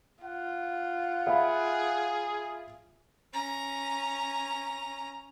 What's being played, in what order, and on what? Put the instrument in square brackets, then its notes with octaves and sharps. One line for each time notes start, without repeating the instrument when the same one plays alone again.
[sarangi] F4 [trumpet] F#5
[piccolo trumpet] G#4 [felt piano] E5 F5 B5
[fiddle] C#4 A#5